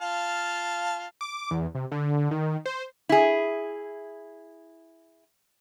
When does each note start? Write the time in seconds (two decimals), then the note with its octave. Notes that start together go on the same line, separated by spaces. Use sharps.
0.01 F4 F5 A5
1.21 D6
1.51 E2
1.75 C3
1.92 D3
2.31 D#3
2.66 C5
3.09 E4 G#4